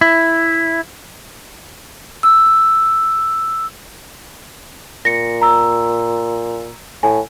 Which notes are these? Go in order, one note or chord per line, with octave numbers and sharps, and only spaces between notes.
E4
E6
A#2 A#6 C#7
A#5 E6
A2 G#5